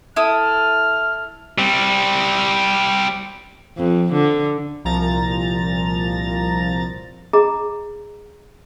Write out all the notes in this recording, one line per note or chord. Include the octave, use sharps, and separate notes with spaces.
E4 A4 D#6 F6
G3 C4
F2
D3
C2 A#2 F3 A#5 A6
G#4 D#5 A#5